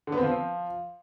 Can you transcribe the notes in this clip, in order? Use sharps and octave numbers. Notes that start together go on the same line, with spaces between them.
D3
B3
C4
F3